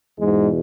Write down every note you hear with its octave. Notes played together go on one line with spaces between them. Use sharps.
E2 G#2 B2 G#3